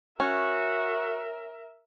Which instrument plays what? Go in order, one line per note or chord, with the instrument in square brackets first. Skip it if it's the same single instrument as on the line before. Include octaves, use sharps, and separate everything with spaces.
[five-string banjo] C#4 [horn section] F#4 [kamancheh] A#4 E5